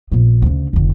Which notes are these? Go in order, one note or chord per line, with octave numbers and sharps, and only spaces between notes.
A#1 B3
D2 C#3
F1 D3